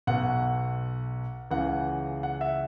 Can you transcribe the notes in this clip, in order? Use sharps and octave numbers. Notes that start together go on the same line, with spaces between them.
B1 B2 F#5
C#2 C#3 E3 F#5
F#5
E5